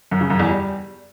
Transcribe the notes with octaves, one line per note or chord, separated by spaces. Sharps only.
F#2
C#3
F#2
E2
G3